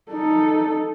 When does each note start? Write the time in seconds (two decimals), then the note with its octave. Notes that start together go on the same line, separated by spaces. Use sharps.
0.11 D#4 A4